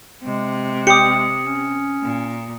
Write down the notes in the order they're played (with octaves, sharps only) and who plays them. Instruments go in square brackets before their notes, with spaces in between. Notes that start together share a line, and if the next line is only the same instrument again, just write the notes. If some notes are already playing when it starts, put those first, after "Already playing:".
[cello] C3 [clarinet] G#3
[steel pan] G4 [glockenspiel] D#6 C#7
[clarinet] C#4
[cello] A#2